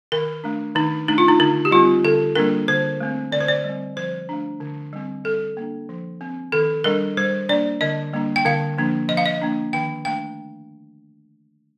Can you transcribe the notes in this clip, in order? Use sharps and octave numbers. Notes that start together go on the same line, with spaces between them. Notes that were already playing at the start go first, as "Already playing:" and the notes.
D#3 A#4
A3 D4
D#3 D#4
A3 D4 D#4
F4
D#4
D3 D#4
G4
G3 C4 F4
D3 A4
G3 A#3 D4 A#4
D3 C5
A3 C4
D3 D5
C5
D5
G3 C4
F3 C5
A3 D4
D3
G3 C4
G3 A4
A#3 D4
F3
C4
D#3 A4
G3 D4 A#4
G3 C5
A#3 D4 D5
D3 D#5
G3 A#3 D4
G5
D3 F5
F3 A#3 D4
F3 D#5
F5
D#5
A#3 D4
D#3 G5
A3 D4 G5